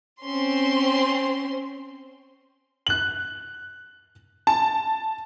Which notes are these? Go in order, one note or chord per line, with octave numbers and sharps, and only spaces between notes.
C4 C#4 C6
F#6 F#7
A5